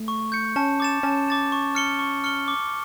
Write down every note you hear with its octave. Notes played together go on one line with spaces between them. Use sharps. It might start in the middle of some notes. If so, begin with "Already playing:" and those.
Already playing: A3
C#6
G6 C#7
C#4 A5
D6 A6 E7
C#4 A5
D6 A6 E7
C#6
F6 C#7 G7
C#6
F6 C#7 G7
D6